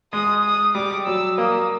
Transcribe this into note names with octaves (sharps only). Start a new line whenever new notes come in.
G#3 D#6
D#6
G3 D6
F#3 E6
A#3 D#6